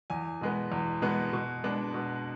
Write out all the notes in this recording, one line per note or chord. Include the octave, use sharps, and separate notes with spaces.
E2 G#5
B2 G#3 B3
E2
B2 G#3 B3
B2
G#3 B3 D4
B2